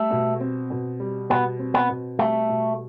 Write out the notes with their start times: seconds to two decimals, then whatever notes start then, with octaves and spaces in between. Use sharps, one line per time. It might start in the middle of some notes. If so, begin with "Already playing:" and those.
Already playing: G3 A3
0.11 B2
0.40 C4
0.70 B2
1.00 G3
1.30 B2 B3
1.59 C4
1.74 B3
1.89 B2
2.19 G3 A3
2.49 B2